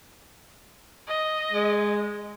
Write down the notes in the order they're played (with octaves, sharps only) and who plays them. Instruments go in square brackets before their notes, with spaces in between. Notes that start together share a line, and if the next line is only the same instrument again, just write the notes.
[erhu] D#5
[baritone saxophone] G#3